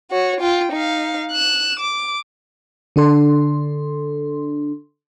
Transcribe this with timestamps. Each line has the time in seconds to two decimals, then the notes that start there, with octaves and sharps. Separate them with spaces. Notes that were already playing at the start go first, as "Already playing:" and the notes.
0.11 F#4 C#5
0.40 F4 G5
0.72 D#4 F5
1.32 F#6 E7
1.80 D6
2.96 D3 D4 A4 C6